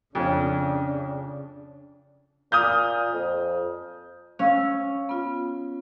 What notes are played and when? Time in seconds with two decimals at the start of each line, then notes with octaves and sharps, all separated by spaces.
0.15 F2 C#3 C#4 D4
2.52 A#2 D#6 F6 G6
3.13 F2
4.39 C#4 F5 E6
5.09 B3 F4